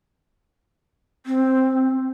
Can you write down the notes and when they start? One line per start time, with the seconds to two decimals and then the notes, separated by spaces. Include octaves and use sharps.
1.26 C4